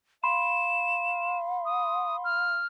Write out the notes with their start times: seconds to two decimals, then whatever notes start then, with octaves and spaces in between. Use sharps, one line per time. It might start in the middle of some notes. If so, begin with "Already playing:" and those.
0.23 F5 B5 C6 E7
1.65 D#6
2.24 F6